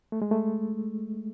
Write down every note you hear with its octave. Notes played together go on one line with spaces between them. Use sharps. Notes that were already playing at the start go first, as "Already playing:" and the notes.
A3
G#3
A3